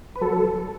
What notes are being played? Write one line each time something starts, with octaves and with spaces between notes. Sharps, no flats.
B4
F#3 A4